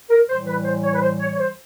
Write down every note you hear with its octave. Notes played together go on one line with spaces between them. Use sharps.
A#4
A2 E3 G3 C5
B4
C5
C#5
B4
C5
C#5
C#5
C5